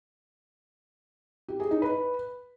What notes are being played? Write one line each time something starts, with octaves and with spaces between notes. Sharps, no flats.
G4
G#4
D#4
B4